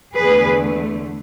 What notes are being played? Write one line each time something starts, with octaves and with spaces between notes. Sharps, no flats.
E2 D3 A3 G#4 B4